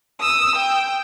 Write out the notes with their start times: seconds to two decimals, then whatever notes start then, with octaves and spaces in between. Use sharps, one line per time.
0.21 D#6 E6
0.56 G5